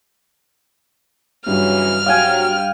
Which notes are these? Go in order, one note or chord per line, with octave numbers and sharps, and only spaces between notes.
G2 C#3 E3 F#3 F6
F#3 F5 G5 G#5